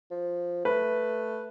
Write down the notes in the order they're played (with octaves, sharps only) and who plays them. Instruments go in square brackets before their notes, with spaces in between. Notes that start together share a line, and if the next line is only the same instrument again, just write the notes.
[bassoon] F3
[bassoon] A3 [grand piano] B4